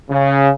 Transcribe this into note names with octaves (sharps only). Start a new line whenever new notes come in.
C#3